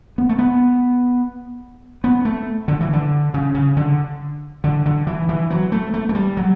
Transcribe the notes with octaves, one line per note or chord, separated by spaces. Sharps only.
B3
A3
B3
B3
A3
D3
E3
D3
C#3
C#3
D3
D3
D3
E3
E3
F#3
A3
A3
A3
G3
F#3